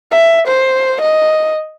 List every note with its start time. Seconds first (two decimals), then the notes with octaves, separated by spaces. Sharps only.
0.12 E5
0.47 C5
1.02 D#5